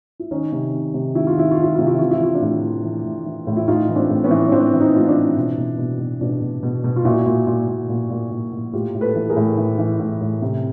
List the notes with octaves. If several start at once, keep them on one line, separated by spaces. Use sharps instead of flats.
E4
D#3 C#4 D#4
C3
D#3
C3
D#3 E4
F4
D#3 E4
F4
D#3
E4
C3 F4
E4
E3 F4
E4
E3 F4
D4 E4
A2
E3
E3
A2
E3
A2
E4
A2 D#4 F4
E3
C4 D4
A2
B3 C#4
E3
C#4
E3 C4 D4
E3
C#4 D#4
A2 F4
D4 E4
E3
B2
B2
B2
B2
B2 D4 E4
B2
B2
B2
F4
A#2 E4 F#4
A#2
A#2
A#2
A#2
A#2
A#2
A#2
A2 F4 G4
A2
A4 B4
E3
G#4 A#4
A2
E3
E3
A2
A2
C3